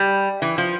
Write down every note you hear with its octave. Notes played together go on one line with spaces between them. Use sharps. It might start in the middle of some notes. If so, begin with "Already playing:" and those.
Already playing: G3
E3
F3